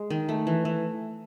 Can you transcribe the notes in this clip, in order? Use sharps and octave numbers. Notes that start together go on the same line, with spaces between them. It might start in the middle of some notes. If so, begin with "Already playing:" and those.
Already playing: G#3
D#3
A3
E3
E3